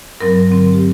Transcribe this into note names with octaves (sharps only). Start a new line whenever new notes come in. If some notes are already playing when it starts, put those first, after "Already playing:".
G2 F#3 C4 A#4
D3 F#3 C4
G4